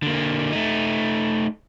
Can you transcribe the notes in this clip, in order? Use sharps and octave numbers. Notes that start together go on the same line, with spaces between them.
D3 A#3
A3 D#4